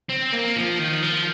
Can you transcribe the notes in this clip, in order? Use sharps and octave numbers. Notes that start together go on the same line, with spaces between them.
C4
A#3
F3
D#3
F3